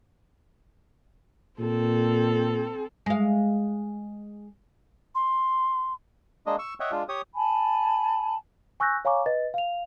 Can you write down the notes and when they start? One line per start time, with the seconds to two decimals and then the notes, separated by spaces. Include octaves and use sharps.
1.59 A#2 C4 A4
3.06 G#3 F5
5.15 C6
6.46 G#3 A#3 D4 D#5
6.59 C#6 E6
6.80 C#5 D#5 E5 F#5 G5
6.91 G#3 D4 F4
7.09 G4 C#5 D#6
7.34 G#5 A5 B5
8.80 G#5 C#6 E6 F#6 G6 A#6
9.05 C#5 F5 G#5 A#5 C#6 D6
9.26 B4 D#5 A6
9.54 F5 F7